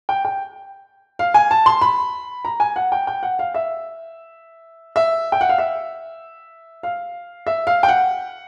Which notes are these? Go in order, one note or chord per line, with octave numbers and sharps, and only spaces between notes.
G5
G5
F5
G#5
A5
C6
B5
A#5
G#5
F#5
G5
G5
F#5
F5
E5
E5
G5
F#5
F5
E5
F5
E5
F5
G5
F#5